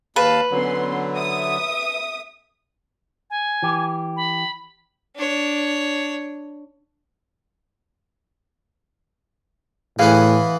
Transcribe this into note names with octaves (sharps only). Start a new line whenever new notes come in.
D#2 B4 F5 A5
D3 F#3 B3 C#4 C6
E5 D#6
G#5
E3 G4
B5
D4 C#5
A2 E3 B3 G#4 F5